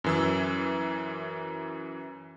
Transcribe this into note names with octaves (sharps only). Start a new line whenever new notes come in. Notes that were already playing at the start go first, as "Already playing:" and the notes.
F#2 E3 E6